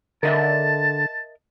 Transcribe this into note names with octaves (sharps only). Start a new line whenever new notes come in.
D3 A#4 D#5 E5 A5